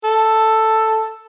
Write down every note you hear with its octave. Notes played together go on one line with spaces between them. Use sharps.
A4